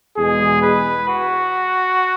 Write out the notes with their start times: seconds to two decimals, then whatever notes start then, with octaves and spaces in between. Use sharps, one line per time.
0.16 E2 B2 G#3 G#4
0.62 B4
1.08 F#4